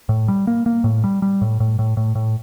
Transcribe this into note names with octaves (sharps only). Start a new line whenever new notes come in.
A2
G3
A#3
A#3
A2
G3
G3
A2
A2
A2
A2
A2